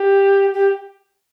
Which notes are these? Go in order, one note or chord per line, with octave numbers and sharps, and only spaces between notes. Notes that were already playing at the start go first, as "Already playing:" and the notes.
Already playing: G4
G4